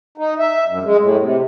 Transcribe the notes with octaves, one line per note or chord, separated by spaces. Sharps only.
D#4
E5
F#2
G#3
A2
C3